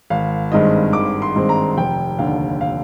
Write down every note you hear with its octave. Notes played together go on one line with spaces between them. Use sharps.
G#1 F5
G2 D#3 G#3 C4 D#5
G#1 D6
C6
G2 D#3 G#3 C4
A#5
F1 G5
D#2 D3 F5
F5